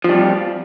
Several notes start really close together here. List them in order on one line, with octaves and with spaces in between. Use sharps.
F3 G3 F2